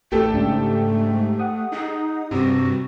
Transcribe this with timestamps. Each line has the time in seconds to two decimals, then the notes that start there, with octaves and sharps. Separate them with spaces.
0.12 A1 A3 G4 A4
0.34 G#2 C#3 G#3 D4
1.39 F#5 D#6
1.72 D#4 G#4
2.31 G2 C3 F#4